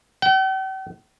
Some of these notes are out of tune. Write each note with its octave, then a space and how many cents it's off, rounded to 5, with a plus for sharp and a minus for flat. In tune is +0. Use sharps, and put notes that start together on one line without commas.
G5 -45